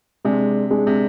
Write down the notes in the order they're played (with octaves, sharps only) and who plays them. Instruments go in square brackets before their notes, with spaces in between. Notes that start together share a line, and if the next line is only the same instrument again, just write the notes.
[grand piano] C3 [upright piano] G#3 D4 G#4
[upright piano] G#3 D4 G#4
[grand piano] C3